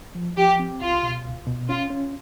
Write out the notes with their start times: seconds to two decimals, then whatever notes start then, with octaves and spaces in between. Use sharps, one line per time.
0.15 F3
0.37 F3 G4
0.59 C4
0.81 C#2 F4
1.03 B2
1.25 C#2
1.47 B2
1.69 C#4 F4
1.90 C#4